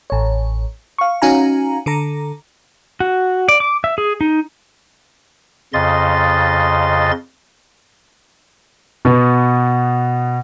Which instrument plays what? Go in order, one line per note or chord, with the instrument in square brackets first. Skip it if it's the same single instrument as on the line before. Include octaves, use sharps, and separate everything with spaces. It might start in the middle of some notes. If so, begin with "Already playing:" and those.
[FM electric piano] A1 C#5
F5 C#6
C#4 D#4 F#4 F5 G#5 A#5
D3 A4 A#5
[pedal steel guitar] F#4
D5
D6
E5
G#4
D#4
[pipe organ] F2 C#3 D#5 C6 A6
[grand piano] B2 B3